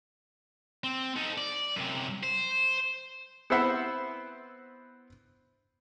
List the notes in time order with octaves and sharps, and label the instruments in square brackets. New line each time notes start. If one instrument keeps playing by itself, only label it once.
[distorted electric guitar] C4
D#4 A4
D5
F#2 C3
C5
[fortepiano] B3 C4 E4 C5 E5 F#5